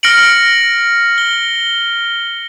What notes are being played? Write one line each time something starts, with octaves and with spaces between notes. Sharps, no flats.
F6 A#6 C#7 D7 F#7
G7